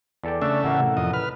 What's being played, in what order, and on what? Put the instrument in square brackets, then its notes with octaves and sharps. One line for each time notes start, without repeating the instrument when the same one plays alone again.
[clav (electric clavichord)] E2 A4 G5 [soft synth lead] D5
[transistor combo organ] C#3 A3 E5 [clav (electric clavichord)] D4
[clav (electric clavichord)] A1 A#3 [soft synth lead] F#5
[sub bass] C3
[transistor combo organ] F2 D#5
B4 F6